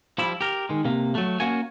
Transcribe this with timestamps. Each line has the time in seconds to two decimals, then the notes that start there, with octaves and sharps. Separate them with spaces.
0.18 F3 G3 E4
0.41 G4 A#4
0.69 D#3 G#3
0.85 C3 A#3
1.15 F#3 A3
1.40 A#3 C#4 F#4 G#5